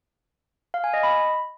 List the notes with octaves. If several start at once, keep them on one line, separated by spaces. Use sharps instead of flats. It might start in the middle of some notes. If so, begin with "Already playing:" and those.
F5
G#5
D#5
B5